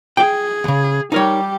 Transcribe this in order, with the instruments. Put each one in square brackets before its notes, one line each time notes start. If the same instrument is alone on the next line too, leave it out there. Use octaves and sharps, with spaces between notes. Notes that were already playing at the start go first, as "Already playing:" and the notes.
[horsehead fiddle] G#4 [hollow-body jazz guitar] G5
[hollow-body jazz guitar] D#2 C#3
[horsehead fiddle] G3 G4 [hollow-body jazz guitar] D#4 A#4 C#5